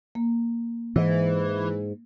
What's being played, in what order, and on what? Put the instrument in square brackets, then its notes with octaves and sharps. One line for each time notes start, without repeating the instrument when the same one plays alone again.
[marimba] A#3
[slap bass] G#2 [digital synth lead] E3